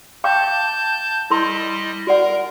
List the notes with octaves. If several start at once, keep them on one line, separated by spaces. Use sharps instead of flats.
F5 G5 A5 D6 G6
G3 E4 A#4 D#5 C6
F#4 A#4 D5 F#5